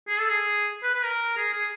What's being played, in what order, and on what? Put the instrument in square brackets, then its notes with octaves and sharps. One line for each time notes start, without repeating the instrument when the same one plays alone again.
[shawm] G#4
A4
G#4
B4
B4
A#4
G#4
G#4